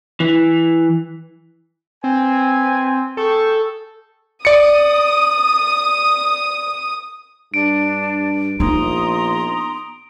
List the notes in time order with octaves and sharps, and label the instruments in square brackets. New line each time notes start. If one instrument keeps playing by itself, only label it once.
[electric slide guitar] E3
[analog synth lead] C4 [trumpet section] B4 G#5
[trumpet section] G#4 G5 C#6 [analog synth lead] A4
[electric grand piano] D5 C#7 [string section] D#6
[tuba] G2 [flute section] D4 [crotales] D7
[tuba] A#1 [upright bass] B3 D#4 [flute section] A#5 C6 D#6